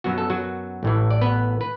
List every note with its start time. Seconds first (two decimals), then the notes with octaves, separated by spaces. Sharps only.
0.04 F#2 F#3 B3 F#4
0.18 A4
0.30 F#3 F#4
0.83 A1 A2 E3
1.10 D5
1.21 B3 B4
1.61 B4